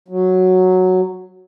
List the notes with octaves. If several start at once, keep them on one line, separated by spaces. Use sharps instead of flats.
F#3